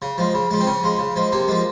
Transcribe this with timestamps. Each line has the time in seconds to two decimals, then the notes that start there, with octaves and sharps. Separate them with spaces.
0.02 C#3
0.18 F3 G#3
0.34 C#3
0.51 F3 G#3
0.60 C4
0.67 C#3 C#4
0.83 F3 G#3
0.99 C#3
1.16 F3 G#3
1.32 C3 A#3
1.48 F3 G#3